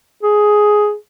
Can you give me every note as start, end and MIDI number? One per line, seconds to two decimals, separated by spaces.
0.23 0.94 68